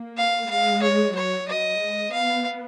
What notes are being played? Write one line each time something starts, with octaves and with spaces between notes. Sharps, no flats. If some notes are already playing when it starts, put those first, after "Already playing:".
Already playing: A#3
F5
G#3 F5
C#5
F#3 C#5
F#3 D#5
G#3
B3 F5